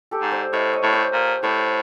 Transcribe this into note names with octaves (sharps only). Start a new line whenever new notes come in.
G4 A4
G#2
C5 D5
A2 D#5 F5
C#5 D#5
A2
C5 D5
A#2
A2 C5 D5